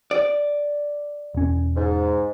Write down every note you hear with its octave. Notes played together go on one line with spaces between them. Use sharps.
D5
E1 C#4
G#2